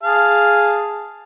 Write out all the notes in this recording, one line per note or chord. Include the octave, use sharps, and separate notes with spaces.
G#4 F5 A5